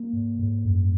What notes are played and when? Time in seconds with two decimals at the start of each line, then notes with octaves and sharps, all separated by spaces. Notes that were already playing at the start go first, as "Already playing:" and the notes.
Already playing: A#3
0.13 G#2
0.39 G#2
0.65 F#2